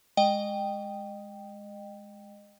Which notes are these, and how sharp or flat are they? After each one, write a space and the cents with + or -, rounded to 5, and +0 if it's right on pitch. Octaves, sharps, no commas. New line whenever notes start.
G#3 +0 D#5 -30 G5 +0